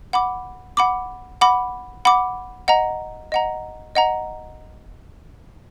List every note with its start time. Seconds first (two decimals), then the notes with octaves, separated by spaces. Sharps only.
0.13 F#5 B5 D6
0.77 F#5 B5 D6
1.41 F#5 B5 D6
2.05 F#5 B5 D6
2.68 D#5 F#5 A#5
3.32 D#5 F#5 A#5
3.95 D#5 F#5 A#5